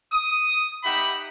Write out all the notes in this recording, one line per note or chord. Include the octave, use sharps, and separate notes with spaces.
D#6
D#4 G4 E5 F#5 B5